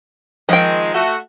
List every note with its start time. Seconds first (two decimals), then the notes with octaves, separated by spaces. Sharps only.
0.49 D#3 F3 G#3 C4 G5
0.93 A3 F#4